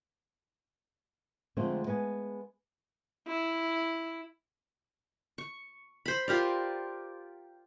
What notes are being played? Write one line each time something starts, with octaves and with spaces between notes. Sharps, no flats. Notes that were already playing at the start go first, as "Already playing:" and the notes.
F2 D3 G#3 A3 C4 A4
G#3 B3 B4 G#5
E4
C#6
C5 B5
F4 G4 A#4 D5